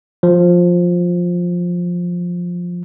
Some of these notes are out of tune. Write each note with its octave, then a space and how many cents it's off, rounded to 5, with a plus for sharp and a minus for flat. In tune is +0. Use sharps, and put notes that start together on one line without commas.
F3 +10